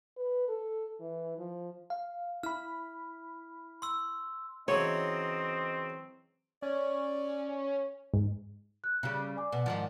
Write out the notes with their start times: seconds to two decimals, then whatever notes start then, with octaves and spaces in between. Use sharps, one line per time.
0.17 B4
0.48 A4
1.00 E3
1.38 F3
1.90 F5
2.43 E4 B5 F6
3.82 C6 E6
4.68 C#3 E3 F#3 C4 C#5 D#5
6.62 C#4 D5
8.14 G#2
8.84 F#6
9.03 C#3 G3
9.36 D5 G#5 D6
9.52 B2
9.66 G#2 D#3 F3